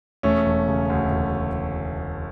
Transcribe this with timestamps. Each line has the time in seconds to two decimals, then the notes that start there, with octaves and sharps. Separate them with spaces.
0.23 E1 A3 C#4
0.46 E1
0.68 C#3
0.90 D2
1.12 E1